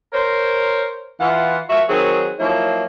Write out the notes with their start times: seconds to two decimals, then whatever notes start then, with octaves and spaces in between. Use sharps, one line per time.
0.13 A#4 C5 C#5
1.20 E3 F4 F#5
1.69 F3 F#4 A#4 C#5 E5
1.89 D#3 F#3 C4 F#4 G#4
2.39 F3 F#3 A#3 D#4 E4 C#5